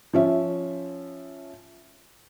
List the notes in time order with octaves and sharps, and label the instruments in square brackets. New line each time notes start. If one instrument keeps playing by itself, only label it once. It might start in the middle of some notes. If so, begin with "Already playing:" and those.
[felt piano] F3 C#4 E5